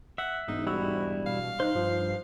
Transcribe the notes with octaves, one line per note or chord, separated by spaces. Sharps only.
E5 F#5
E1 G#2 D#4
G3 E4 F#4 E6
B2 F5
D#4 C5 F#6
G2 F3